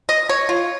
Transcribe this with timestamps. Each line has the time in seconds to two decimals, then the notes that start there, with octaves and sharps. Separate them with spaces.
0.09 D#5
0.29 C#5
0.49 F4